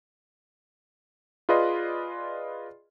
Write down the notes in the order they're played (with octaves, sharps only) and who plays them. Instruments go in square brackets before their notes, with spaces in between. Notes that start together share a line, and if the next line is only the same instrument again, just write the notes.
[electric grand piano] F4 G#4 B4 D5 D#5 C6